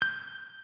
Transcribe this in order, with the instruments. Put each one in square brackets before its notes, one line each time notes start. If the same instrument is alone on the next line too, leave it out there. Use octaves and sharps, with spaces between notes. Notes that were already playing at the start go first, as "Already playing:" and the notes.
[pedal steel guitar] G6